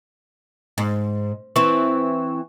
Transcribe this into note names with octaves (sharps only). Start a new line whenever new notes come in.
G#2
E3 C4 C#6